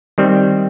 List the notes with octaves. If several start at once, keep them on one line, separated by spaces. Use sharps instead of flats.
D#3 G3 C4